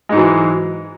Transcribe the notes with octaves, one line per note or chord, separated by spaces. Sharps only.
G#2 E3 F#3 G#3